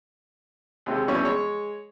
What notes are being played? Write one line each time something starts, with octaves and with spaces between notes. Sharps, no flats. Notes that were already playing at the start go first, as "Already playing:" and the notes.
D#2 C3 G#3
G2 B2 E3 G3 C#4 C#6
G#3 C#5